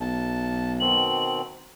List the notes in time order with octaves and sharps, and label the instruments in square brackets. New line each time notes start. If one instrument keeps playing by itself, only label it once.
[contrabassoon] B1 [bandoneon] A5
[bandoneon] B2 D#3 C4 [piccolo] F#7